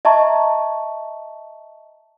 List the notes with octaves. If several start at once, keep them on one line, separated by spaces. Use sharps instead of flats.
D#5 E5 A5 A#5 C#6